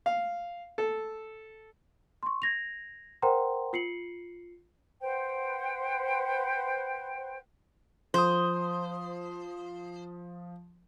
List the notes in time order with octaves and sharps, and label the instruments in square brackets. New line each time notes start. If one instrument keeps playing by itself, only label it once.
[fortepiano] F5
A4
[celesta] C6 C#6
G#6 A#6 F7
A#4 C5 F#5 G5 A#5 C6
F4 C7 C#7 F#7
[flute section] B4 C5 F#5 G5
[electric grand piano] F3 D#6 [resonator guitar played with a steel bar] C5